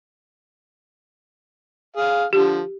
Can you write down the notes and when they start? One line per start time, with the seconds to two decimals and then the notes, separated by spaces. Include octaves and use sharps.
1.96 G#4 F5
2.33 D3 F3 G4